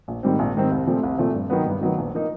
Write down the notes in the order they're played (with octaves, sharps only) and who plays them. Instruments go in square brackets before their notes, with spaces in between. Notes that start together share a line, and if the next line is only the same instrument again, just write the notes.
[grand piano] A#1
G#2 D#3 G3 C4
A#1
G#2 D#3 G3 C4
C2
A#2 F3 A3 C4
C2
A#2 F3 A3 C4
G2
D#3 F#3 B3
G2
D#3 F#3 B3
A#1
F3 A#3 D#4